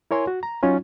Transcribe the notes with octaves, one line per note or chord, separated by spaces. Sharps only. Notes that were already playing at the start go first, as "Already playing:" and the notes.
E4 A#4 C#5 G#5 C6
F#4
A#5
F#3 C#4 D#4 F4